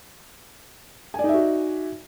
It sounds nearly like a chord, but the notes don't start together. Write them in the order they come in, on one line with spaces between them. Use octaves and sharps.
G#5 D5 D#4 E5 F#4